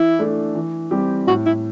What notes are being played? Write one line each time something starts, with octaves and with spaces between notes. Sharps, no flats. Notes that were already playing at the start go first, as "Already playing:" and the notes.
Already playing: E3 E4
A3 D4 A4
E3
G3 C4 G4
A2 F#4
E4